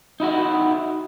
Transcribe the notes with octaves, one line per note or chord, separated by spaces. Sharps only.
D#4 E4 F#4 F#5